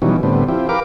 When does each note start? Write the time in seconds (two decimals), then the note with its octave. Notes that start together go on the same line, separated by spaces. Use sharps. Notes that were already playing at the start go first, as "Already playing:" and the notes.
0.02 B2 D#3 E3 F#3 G3 C#4
0.23 A2 D3 G3 B3 C4
0.48 F3 C4 E4 G4
0.69 G4 A#4 B4 F5 D6